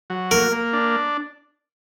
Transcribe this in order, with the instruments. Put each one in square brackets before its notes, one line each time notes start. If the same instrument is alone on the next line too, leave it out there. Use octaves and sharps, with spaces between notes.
[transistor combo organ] F#3
[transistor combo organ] A#3 [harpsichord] A#4
[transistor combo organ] A#3
D4